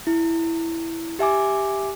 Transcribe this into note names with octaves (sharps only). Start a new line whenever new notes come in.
E4
G4 E5 G#5 D6